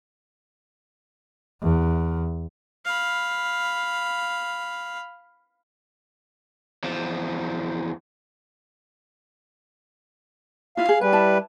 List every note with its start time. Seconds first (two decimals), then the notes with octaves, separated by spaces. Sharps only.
1.62 E2
2.85 F5 B5
6.84 E2 F3
10.77 E4 F4 F5
10.89 G#4
11.01 G3 B4 G#5
11.13 E4 A5